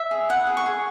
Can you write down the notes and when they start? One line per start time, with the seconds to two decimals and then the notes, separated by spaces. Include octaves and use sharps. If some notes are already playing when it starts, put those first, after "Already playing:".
Already playing: E5
0.11 G#4
0.29 E4 F#5
0.47 G#4
0.57 C#6
0.66 G#4